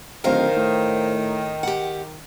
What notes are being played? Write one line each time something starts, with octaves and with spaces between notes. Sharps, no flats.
D1 D#3 A#4 C5 F5
A2
G4 F#5